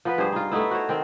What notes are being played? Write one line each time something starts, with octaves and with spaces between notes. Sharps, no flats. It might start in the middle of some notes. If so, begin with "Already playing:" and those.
F3 B3 B4
G2 G#4 C5
D#4 F4
A3 B3 D#4 E4
F#4 C5 C#5
D#3 C4